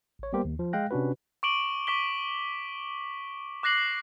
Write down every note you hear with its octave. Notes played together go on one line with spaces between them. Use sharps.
A1 C#5
G3 A#3 B3 G4 A#4 C5
D#2
F3
G#3 F5 G5 F#6 A#6
C3 C#4 D4 F#4 B4
C#6 D6 D7 F#7 G7
C#6 D6 B6 G7
D6 F#6 A#6 C7 F#7